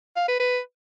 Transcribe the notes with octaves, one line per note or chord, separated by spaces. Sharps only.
F5
B4
B4